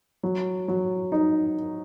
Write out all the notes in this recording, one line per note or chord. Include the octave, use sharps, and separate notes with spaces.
F#3
F#3
D#4